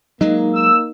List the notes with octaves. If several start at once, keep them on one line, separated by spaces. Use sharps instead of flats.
F#3 G#3 A#3 D#4
E6